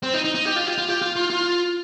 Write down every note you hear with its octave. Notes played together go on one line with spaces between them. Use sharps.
C4
D#4
D#4
D#4
G4
F4
G4
F4
G4
F4
F4
F4